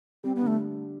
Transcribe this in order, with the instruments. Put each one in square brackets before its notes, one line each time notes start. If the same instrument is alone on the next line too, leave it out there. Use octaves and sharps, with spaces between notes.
[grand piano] G3 [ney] C4
[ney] B3
[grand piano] D3 [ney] A3